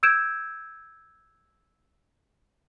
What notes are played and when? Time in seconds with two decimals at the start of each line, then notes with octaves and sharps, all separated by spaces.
0.03 E6 G6 G#6 D7 E7